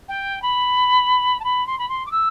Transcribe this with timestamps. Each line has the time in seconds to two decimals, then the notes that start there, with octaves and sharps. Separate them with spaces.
0.08 G5
0.42 B5
1.40 A5
1.44 B5
1.67 C6
1.79 B5
1.89 C6
2.06 D6
2.11 E6